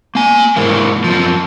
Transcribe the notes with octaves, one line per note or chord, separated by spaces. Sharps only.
A#3 G#5
G#2 E3 A#3
F#2 F3